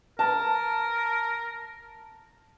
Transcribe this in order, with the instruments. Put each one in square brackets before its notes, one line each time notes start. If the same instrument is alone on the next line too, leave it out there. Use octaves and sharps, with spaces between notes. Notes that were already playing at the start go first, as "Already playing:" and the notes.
[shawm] A#4 [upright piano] A5